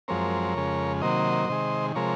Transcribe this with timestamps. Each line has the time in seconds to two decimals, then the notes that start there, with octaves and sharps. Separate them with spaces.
0.08 F#2 F3 G#3 C4 A#4 C#5
0.55 F2 C#3 G#3
1.01 C3 D#3 F#3 A#3 C5 D#5
1.49 C3 D#3 G#3
1.95 C3 F3 G#3 A#4 C#5